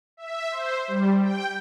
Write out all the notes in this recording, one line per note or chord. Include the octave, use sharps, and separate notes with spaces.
E5
C5
G3
G5